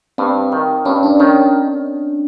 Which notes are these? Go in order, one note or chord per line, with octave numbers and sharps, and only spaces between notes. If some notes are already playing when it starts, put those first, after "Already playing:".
G2 C4
D#3
G2 C#4
D4
D#3 C#4